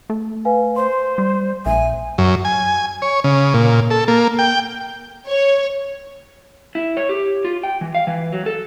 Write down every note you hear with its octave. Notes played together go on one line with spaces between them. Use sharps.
A3
B4 F5 G#5
C5 C6
G3
A#1 E5 G#5
F#2
G#5
C#5
C#3
A#2
A4
A#3
G5
C#5
E4
C#5
G4
F4
G5
E3
F5
E3
F#3
A4